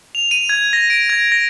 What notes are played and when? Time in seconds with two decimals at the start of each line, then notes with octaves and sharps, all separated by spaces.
0.15 F7
0.31 D#7
0.49 G#6
0.73 A#6
0.90 D7
1.09 G#6
1.32 A#6